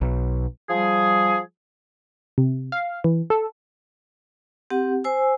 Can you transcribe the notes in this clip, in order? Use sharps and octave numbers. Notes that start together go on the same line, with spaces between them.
B1
F3 G3 G#4
C3
F5
E3
A4
C4 G4 F#5
C5 G#5 E6